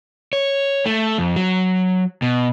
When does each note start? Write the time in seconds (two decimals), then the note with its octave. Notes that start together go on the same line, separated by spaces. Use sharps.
0.33 C#5
0.86 A3
1.18 F2
1.36 F#3
2.22 B2